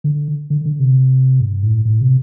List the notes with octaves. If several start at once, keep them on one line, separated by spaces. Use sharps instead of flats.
D3
D3
D3
C3
G2
A2
A2
C3